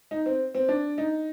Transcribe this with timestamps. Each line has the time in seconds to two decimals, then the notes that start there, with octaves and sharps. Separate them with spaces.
0.11 D#4
0.26 C4
0.55 C4
0.69 D4
0.98 D#4